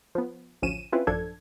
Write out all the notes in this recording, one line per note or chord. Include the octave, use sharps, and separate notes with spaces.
F3 B3
A1 D2 F3 C#4 D#7 E7
C4 C#4 E4 F4 B4
A1 F#2 F3 D4 A4 G#6